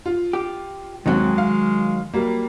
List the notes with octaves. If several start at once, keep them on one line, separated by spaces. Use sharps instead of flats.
F4
G4
D#2 D#3 F#3 G#3 C4
F5
F#3 G3 A#3